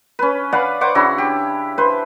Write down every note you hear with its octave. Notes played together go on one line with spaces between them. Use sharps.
C#4 B4
B4 D5 F5 F#5
C5 F#5 C#6 D6
C#3 D4 E4 F#4
G4
B4 C5